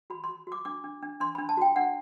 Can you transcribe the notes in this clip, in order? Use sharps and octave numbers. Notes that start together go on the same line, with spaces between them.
F#4 B5
C6
F#4
F#4 D6
D4 D6
D4
D4
D4 C6
D4 B5
A5
F#4 G5
D4 F#5